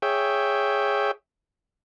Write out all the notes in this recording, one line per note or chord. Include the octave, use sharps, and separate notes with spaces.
G#4 C#5 E5 G5